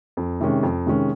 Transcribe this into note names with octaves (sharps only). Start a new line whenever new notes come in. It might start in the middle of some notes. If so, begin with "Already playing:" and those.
F2
C3 D#3 G#3 C#4
F2
C3 D#3 G#3 C#4